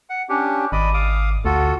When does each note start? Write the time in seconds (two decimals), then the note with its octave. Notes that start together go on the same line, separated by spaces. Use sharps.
0.09 F#5
0.29 C#4 D4 G4
0.72 G#1 D5 D#5 B5
0.94 F5 D6 D#6
1.45 D2 F4 F#4 A4